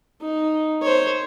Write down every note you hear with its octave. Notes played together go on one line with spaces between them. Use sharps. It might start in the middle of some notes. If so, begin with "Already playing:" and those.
D#4
C5 C#5